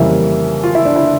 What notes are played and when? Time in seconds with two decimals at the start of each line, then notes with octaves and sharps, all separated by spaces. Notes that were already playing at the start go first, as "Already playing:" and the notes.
Already playing: F2 C#3 E3 G3 A#3 E4
0.64 F4
0.75 E4
0.85 D4
0.96 E4